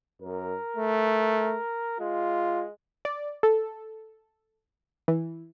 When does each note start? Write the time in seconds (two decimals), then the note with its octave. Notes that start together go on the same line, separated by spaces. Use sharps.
0.22 F#2 A#4
0.76 A3
2.00 G#3 F4
3.05 D5
3.43 A4
5.08 E3